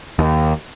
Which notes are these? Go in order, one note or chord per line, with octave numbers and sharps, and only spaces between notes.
D#2